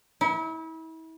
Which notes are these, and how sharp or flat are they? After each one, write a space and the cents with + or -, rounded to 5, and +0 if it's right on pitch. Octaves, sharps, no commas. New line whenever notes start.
E4 -35